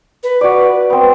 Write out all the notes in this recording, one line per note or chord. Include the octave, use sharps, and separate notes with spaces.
B4
F#4 D5
B3 C4